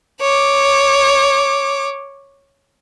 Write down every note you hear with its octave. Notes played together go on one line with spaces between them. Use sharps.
C#5 D6